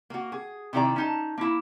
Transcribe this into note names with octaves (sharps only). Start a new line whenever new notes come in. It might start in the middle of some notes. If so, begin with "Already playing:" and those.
A#3 F#4
G#4
C3 D#3 E4 G4 D5 A#5
C#4 D#4 A5
A#3 E4